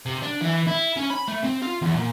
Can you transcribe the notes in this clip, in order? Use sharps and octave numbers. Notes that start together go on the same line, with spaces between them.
C3
D4
E3
E4
C#4
B5
A3
C4
F4
E2
A#2